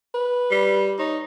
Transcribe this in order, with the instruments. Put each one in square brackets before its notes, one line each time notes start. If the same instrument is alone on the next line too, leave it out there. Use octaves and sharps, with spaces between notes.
[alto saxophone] B4
[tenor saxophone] G3
[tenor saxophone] D#4 [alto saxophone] C#5